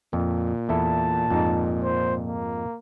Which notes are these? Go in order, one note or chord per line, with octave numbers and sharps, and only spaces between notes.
F2 A#2
E2 E4 A4 A5
F2 G#2 D#4
C5
A#3